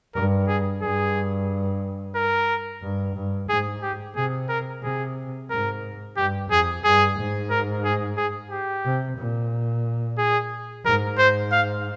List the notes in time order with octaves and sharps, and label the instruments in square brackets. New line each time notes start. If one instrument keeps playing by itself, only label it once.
[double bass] G2 [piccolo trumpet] A#4
[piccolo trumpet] G#4
[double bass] G2 [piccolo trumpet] G#4
[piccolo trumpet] A#4
[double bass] G2
G2
[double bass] G#2 [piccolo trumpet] G#4
[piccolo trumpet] G4
[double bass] C3 [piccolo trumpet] G#4
[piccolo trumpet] A#4
[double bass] C3 [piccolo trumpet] G#4
[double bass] G#2 [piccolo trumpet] A#4
[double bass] G2 [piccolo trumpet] G4
[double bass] F2 [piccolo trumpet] G#4
[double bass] G2 [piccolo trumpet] G#4
[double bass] G#2
[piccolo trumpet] A#4
G#4
G#4
G4
[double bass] C3
A#2
[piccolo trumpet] G#4
[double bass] G#2 [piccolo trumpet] A#4
[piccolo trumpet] C5
F5